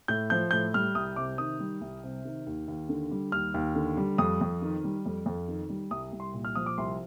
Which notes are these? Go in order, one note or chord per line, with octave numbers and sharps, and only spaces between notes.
A2 G6
F3 G6
A2 G6
G3 F6
C2 D#6
C3 D6
D#3 D#6
G3
C2
C3
D#3
D#2
D#2
D3
G3
D#2 F6
D#2
D3
G3
F2 D#6
F2
D#3
G3
F2
F2
D#3
G3
C2 D#6
C2
C6
A#2
F6
F3 D#6
D6
C2 C6